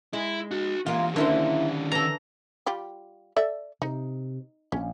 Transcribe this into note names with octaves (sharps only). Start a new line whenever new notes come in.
G#3 E4
F#4 C6
E3 G#3 A#3 F4 G4
D3 D#3 A#3 C#4 E4 C5
E3 A4 A#5
G3 F4 G4
A4 D5 E5
C3 D#4
A#1 C#4